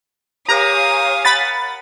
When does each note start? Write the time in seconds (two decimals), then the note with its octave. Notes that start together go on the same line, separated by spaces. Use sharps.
0.49 G4 A#4 C#5 F5 G#5 A#5 D#6
1.25 F#5 B5 A6